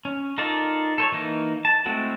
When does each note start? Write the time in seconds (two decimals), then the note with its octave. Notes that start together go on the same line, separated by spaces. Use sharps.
0.05 C#4
0.38 D#4 F4 A4 A#4 D5
0.98 A4 C5 C#5
1.12 E3 A#3 D#4
1.65 A5
1.86 G#3 A3 C4 E4 F#4